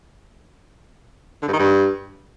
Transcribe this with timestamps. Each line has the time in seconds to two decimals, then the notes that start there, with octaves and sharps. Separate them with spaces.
1.42 D3
1.48 G2
1.54 D#3
1.59 G2